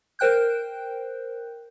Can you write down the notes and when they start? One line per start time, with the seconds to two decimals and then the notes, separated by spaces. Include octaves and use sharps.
0.19 A#4 C5 G5 F#6 G6